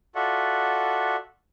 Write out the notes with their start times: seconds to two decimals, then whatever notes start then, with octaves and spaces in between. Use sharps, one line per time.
0.15 F4 F#4 A4 D5 E5 F#5